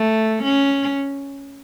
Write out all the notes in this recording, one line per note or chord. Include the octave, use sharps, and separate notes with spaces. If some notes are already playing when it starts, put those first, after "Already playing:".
Already playing: A3
C#4